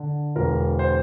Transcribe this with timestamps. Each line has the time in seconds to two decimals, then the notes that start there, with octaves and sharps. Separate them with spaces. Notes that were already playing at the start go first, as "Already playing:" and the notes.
Already playing: D3
0.36 E1 A#4
0.79 C5